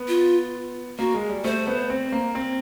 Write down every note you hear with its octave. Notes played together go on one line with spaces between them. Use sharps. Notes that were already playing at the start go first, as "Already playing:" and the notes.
Already playing: B3
F4
A#3 F#4
G#3
G3
A3 C5
B3
C4
A#3
C4